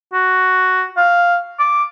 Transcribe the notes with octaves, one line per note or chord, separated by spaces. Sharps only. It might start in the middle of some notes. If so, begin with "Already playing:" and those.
F#4
F5
D6